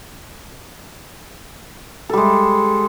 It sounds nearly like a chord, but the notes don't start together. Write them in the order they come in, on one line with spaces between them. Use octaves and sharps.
A4 G3 G#3